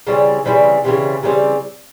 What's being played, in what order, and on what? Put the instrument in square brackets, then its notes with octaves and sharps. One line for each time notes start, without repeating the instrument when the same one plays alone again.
[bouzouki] C#3 E3 G3 C4
C#3 E3 G3 C4
C#3 E3 G3 C4
C#3 E3 G3 C4